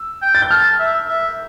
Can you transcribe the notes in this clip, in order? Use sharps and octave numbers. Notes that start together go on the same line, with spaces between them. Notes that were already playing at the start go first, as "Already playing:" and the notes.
Already playing: E6
G5
A6
G6
A5 F6
E5
E5